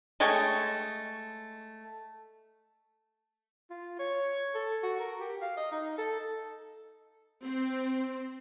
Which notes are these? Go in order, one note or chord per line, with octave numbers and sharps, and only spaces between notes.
G#3 A3 C#5 G5
F4
C#5
A4
F#4
A#4
G4
F5
D#5
D#4
A4
C4